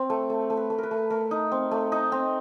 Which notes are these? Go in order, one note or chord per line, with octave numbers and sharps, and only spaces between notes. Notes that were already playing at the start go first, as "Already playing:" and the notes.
Already playing: C4
A3
A3
A3
B4
A3
A#4 B4
A3
A3 A#4
D#4
C4
A3
D#4
C4